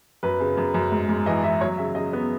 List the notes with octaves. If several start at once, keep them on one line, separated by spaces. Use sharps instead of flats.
F#2 B4
C#3
F#2
F#2
G#2
G#2
E3 D#5
E3 E5
F#3 C#5
C#3 E5
C#3 D#5
B3